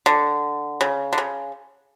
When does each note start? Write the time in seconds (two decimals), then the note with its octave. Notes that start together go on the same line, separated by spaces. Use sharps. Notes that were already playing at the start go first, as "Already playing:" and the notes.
0.06 D3
0.81 C#3
1.13 D3
1.18 C#3